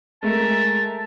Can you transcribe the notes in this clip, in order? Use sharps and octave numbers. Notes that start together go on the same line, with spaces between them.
G#3 A3 A#4 E5 A5